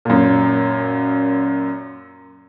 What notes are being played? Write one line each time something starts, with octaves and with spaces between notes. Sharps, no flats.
F#2 A#2